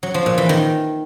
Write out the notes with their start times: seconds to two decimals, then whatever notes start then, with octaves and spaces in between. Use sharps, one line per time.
0.03 F#3
0.14 F3
0.26 A#2
0.38 E3
0.49 D#3